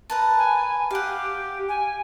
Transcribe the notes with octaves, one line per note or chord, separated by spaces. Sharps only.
A#4 B4 A5
G#5
G4 F5 F#5
G#5